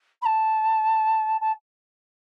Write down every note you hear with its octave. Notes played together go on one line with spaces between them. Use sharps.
B5
A5
A5